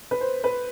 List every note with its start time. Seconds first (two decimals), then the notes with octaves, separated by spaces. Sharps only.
0.11 B4
0.21 C5
0.44 B4